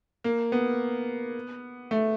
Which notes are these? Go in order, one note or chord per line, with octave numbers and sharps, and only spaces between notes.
A#3
B3
A3